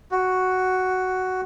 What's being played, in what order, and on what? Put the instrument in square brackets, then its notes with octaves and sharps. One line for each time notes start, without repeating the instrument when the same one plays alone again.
[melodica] F#4